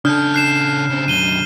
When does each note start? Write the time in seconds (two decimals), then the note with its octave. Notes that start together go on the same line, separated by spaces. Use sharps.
0.05 C#3 D4 A4 F6 G6
0.34 F#6 C7 E7
0.89 C#3 C4
1.08 B1 F#2 D#7 G7